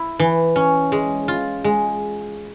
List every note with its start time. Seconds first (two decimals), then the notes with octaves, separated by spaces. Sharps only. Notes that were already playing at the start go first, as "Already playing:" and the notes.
Already playing: E4
0.19 E3
0.56 C#4
0.92 G#3
1.28 F4
1.64 G#3